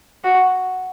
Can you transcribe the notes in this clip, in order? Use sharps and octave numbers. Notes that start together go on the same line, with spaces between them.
F#4